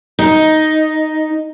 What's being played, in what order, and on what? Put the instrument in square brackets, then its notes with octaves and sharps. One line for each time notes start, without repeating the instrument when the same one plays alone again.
[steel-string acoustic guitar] D#4